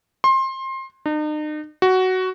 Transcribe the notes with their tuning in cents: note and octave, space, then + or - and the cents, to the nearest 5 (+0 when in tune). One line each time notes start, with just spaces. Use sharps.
C6 +25
D#4 -40
F#4 +10